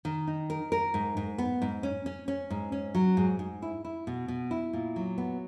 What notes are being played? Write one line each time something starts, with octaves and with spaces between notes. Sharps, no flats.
D#3
D#4
A#4
A#4
G#2
G#2
B3
G#2
C#4
C#4
C#4
G#2
C#4
F#3
G#2
G#2
E4
E4
B2
B2
E4
A#2
F#3
B3